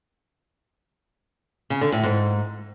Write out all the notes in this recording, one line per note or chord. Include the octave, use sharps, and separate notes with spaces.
C#3
D3
A2
G#2